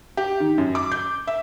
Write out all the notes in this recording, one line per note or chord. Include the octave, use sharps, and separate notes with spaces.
G4
D#3
F#2
D6
G6
E5